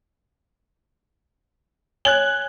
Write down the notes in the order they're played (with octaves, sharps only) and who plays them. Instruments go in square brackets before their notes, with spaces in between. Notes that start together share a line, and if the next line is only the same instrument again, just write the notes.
[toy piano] C#5 G#5 [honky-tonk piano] F#6 G#6 F#7